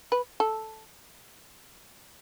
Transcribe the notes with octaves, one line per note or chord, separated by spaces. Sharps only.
B4
A4